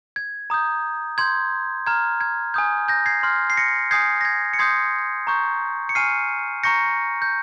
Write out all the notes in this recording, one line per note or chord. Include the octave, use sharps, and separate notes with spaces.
G#6
A#5 D#6 G6
C6 G6 G#6
A#5 F6 G#6
G#6
G#5 D#6 G6
G6 A#6
G#6 C7
C6 F6
C7
A#6 C#7
G#5 D#6 G6 G#6 C7
A#6
G#6
C#7
C6 D#6 G6 G#6 C7
A#5 C#6 G6
C#7
G#5 C#6 F6 C7 D#7
A#5 C#6 G6 A#6 C#7
G6